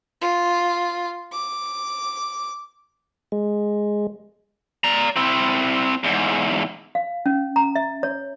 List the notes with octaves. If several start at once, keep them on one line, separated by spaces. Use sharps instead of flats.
F4
D6
G#3
D5 A#5
C4 E4
E2 G#2
F5
C#4
A#5
E5
C#5